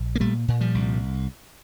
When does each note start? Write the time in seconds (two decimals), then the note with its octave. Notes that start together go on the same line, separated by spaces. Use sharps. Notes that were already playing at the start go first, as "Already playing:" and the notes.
Already playing: A#1
0.15 A#3
0.20 A#2 G3 A3
0.48 A#2
0.61 F3 G3
0.75 C2